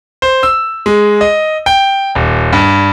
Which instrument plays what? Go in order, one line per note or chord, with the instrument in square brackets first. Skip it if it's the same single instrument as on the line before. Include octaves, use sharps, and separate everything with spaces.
[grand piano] C5
E6
G#3
D#5
G5
D#1
G2